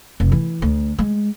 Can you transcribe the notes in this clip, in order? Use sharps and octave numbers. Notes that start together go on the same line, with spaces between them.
F1
E3
D2
G#3